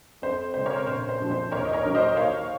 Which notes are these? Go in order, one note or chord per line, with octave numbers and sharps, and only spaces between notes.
F2 C5
C#3 G#3 C4 C5
A#4 C#5
A#1 C5
C5
A#2 F3 C4
C5
D#2 A#4 C#5
D#5
A#4 C#5
D#3 F#3 A#3
C5 D#5
D#2 C#5 F5